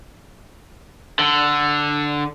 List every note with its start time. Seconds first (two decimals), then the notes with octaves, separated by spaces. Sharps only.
1.19 D3